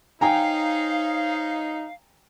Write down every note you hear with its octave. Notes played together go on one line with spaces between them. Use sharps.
D#4 C5 C#5 F5 G5 G#5 A#5